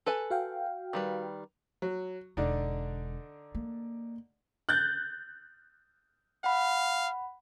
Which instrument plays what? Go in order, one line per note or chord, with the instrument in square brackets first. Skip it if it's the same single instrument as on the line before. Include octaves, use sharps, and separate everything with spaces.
[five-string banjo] A4 B4 G#5
[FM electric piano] F#4 F5 G5
[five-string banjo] D#3 G3 B4
[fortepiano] F#3
[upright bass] E1 [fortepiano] D3 D4 D#4
[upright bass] A#3
[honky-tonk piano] F#6 G6 A6
[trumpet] F5 [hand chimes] F#5 B5